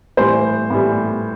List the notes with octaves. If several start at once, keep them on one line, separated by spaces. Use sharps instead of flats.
A2 E3 G3 C5
A2 E3 G3